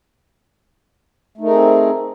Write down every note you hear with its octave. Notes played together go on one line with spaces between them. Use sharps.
A3 C4 D#4 G#4 A#4